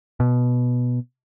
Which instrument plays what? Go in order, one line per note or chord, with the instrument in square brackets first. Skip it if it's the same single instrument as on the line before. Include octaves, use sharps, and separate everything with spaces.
[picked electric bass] B2